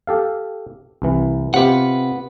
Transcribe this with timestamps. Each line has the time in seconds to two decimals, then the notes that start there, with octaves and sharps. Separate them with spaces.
0.07 G4 A4 F5
1.02 C2 E3
1.54 C3 F4 G4 B4 F#5